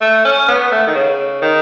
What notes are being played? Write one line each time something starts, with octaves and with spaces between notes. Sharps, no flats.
A3
C#4
B3
A3
D#3
C#3
D#3